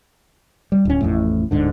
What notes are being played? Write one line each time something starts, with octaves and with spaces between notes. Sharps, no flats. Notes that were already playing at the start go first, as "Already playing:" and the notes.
G3
D1 C#4
A1 F2 A2
D1 G#2 D3